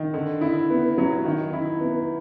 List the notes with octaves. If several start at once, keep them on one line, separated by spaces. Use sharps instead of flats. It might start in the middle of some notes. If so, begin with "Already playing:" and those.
Already playing: D#3
D3
E4
B3
F#3
D#3
E4
B3